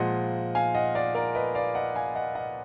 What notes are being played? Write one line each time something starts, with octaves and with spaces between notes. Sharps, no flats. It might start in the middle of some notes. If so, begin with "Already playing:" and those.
Already playing: A#2 F3 G#3 D#5 F#5
F5 G#5
D#5 F#5
D5 F5
A#4 D5
B4 D#5
D5 F5
D#5 F#5
F5 G#5
D#5 F#5
D#5 F#5